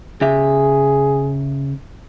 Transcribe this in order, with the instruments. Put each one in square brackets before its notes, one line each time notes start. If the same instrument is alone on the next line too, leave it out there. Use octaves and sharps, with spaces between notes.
[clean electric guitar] C#3 E5 [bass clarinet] G#4